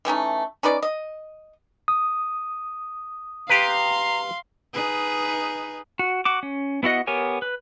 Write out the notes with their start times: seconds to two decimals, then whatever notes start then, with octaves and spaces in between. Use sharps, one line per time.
0.05 E3 A3 C#4 D#4
0.63 C#4 D#4 B4 D5
0.83 D#5
1.88 D#6
3.49 G4 B4 F5 A#5 C6
4.74 D#4 G#4 B4
5.99 F#4
6.25 F#4 D6
6.43 C#4
6.83 B3 E4 F#4 D#5 F#5
7.07 B3 G4 A#4 C#5 G#5
7.42 B4